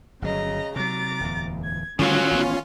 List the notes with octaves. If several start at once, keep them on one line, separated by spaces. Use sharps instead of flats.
G1 C#3 F#3 D#5 A#5
C3 F#3 A#5 D6 A6
D1 E2
G#6
A2 D3 D#3 F#3 G3 A3 C#4 F4
A1 B3